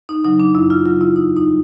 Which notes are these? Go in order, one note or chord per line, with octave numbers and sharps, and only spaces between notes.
D#4
C#3 F#3 D#4
D4
F#2 E4
F4
C#3 F#3 F4
E4
E2 D#4
D#4
G3